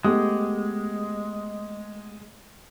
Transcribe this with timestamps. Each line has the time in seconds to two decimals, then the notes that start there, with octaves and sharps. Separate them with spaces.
0.05 G#3 A3 B3 G4